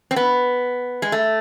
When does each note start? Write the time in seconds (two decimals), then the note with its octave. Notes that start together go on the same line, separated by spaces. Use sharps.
0.11 C4
0.16 B3
1.02 G#3
1.12 A3